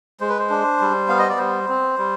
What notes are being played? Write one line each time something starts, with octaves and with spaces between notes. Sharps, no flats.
G#3 C5
B4
C5
D4
G3
B3 F5
D#5
D5
G3 C5
C4
G3